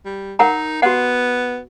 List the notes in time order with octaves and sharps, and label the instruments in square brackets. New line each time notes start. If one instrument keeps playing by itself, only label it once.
[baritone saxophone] G3
[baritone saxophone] D#4 [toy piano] A#4 F#5 A#5
[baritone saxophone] B3 [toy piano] F#4 F#5